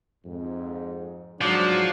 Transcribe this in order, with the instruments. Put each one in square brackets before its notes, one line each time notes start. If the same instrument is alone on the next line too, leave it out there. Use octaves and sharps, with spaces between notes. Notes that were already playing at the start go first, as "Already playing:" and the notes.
[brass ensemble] F2 G#2
[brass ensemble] G#2 F#3 [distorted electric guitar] F3 [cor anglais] D4